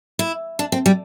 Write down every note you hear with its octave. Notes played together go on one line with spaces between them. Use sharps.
E4
D4
C4
G3